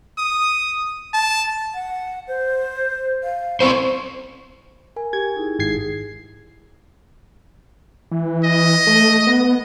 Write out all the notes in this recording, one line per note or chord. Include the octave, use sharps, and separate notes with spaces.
D#6
A5
F#5
C5
F5
C4 E4 C5 C#6
A#4 G#5
G4 G#6
D#4 E4 G#4
G#1 G#6 C7
E3
D#5
A3
B3